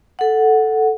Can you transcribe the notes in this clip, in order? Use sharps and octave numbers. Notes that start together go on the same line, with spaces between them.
A4 F#5